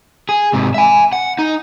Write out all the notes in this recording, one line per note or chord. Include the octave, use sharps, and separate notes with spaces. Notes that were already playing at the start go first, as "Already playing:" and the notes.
G#4
G#2 C3
E5 G#5
F#5
D#4